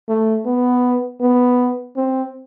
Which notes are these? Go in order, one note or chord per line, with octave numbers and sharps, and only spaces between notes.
A3
B3
B3
C4